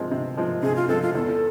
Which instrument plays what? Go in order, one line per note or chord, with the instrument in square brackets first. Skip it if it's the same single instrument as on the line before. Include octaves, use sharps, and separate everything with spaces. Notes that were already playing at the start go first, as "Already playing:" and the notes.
Already playing: [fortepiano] C3 F3 G#3 C4
C3
F3 G#3 C4
[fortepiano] C3 [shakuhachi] G#4
[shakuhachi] F4
[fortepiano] F3 G#3 C4 [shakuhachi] A4
[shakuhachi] F4
[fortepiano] E2 [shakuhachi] A4